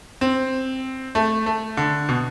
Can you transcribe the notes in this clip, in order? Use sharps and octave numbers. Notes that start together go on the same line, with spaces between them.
C4
A3
A3
D3
B2